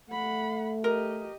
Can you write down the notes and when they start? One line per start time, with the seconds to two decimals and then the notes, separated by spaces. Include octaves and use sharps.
0.10 A3 F#5 B5
0.84 G4 A#4 D#5